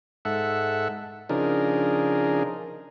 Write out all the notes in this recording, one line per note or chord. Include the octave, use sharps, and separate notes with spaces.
G#2 A4 E5 F#5
C#3 F3 D4 D#4 G#4 A#4